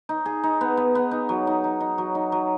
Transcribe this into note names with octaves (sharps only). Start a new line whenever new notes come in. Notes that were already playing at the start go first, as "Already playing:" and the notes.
D#4
G#4
D#4
B3
B3
B3
D#4
F#3
D#4
D#4
D#4
F#3
D#4
F#3